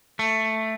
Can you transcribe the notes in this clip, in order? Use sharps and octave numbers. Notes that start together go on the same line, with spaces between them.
A3